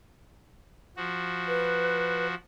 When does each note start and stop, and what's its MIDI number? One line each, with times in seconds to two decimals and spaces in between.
0.97 2.35 53
0.97 2.35 66
1.48 2.27 71